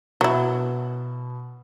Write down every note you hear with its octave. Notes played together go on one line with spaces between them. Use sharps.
B2 F#3 E4